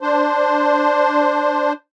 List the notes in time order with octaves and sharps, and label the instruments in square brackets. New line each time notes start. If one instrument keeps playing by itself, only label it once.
[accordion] D4 C5